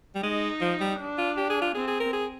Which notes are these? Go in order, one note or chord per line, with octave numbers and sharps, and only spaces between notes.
G3
G#3 D#4
F3
G3
D4
F4
G4
G#4
F4
C4 G#4
G#4
A#4
G#4